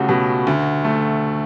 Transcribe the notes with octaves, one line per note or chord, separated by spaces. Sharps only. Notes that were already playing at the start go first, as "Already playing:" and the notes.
Already playing: C#2 A3 C#4 F#4 G4
B2
D2
A3